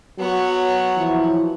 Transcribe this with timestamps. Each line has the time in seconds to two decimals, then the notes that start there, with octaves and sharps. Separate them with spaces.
0.19 F#3 B3 C#5
0.97 E3 F3 E4